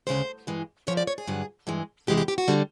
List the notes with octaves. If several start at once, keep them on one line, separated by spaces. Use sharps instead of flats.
D2 C#3 F3 G#3 C5
G2 E3 G#3
E2 C#3 F3 C#5
D5
C#5
G#4
G2 D3 F#3
G2 E3 G#3
E2 C3 E3 G#3 G4
G4
G4
F#4
D3 G3